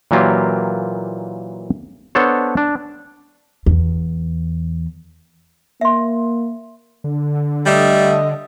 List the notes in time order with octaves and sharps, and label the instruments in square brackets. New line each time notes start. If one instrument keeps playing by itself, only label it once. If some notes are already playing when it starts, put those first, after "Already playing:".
[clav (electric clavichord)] A#2 E3 F#3 A#3 F4 G4
B3 D4 A4 C5 C#5
D4
[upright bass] E2
[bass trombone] A#3 [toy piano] E5 C6
[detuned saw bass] D3
[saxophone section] G3 A3 [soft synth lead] D#5